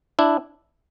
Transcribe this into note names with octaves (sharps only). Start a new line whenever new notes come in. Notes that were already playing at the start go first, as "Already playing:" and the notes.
D4 E4